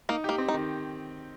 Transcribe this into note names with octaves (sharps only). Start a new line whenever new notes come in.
A#3 D#4
A#3 G4
C4
D#4
D#3